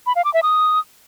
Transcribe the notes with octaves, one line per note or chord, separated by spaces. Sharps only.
B5
F5
D6
E5
D#6